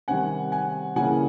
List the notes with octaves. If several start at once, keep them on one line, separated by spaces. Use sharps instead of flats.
C3 D#3 G3 F#5 G#5
F#5 G#5
C#3 E3 G3 A#3 F#5 G#5